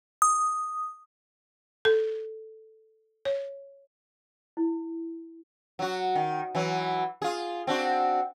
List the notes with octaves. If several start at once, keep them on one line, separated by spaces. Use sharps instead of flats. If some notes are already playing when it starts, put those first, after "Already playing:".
D#6
A4
C#5
E4
F#3 F#4
D#3
E3 F#3
F4 G#4
C4 D4 F#4